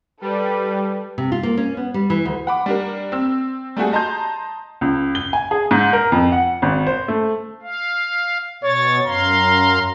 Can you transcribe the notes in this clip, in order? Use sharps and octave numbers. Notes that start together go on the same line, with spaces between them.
G3 A4 B4
C3
F4
A#3
C#4
B3
G3
E3
D2
F#5 B5 D6
G3 D4 A#4
C4 E6
G3 A3 F#4 G#4
D#5 A5 A#5 C6 G6
C#2
G7
G#5
G#4
G#2
A#4
F2
F#5
G#1
C5
A3
F5
B2 C#5 A6
F#2 F5 A#5 C6